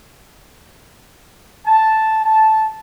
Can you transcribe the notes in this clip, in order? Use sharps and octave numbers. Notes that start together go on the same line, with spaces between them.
A5
A5